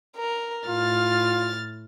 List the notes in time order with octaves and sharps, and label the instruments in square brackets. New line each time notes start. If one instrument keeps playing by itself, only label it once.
[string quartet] A#4
[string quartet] A2 F6 A6 [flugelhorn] F4